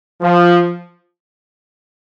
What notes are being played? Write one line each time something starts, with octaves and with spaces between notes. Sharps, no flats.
F3